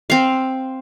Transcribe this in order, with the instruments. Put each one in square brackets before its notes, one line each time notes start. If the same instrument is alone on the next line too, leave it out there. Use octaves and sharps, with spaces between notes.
[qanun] C4 F5